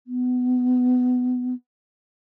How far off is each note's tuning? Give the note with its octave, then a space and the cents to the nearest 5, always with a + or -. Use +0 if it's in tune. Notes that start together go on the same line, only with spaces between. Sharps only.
B3 +20